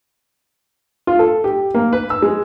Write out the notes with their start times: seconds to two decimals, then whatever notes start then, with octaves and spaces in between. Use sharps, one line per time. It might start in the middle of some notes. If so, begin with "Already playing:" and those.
1.07 F4
1.19 A4
1.44 G4
1.74 A#3
1.93 B4
2.10 E6
2.22 G#3